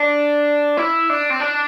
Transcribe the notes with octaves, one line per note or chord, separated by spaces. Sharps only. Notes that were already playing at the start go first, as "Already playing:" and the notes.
Already playing: D4
E4
D4
C4
D4